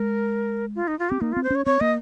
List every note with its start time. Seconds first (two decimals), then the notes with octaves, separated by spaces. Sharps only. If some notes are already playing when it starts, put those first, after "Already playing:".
Already playing: G#3 A#4
0.75 F4
0.88 D#4
0.99 F4
1.10 C4 G4
1.21 A#3 D#4
1.32 C4 F4
1.44 C5
1.51 C#4 C#5
1.66 C4 C#5
1.80 A#3 D#5